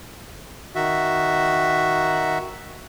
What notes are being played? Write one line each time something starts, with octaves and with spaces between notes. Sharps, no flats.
D#3 F#4 E5